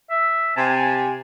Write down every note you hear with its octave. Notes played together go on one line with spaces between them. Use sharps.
E5
C3 G#5 A5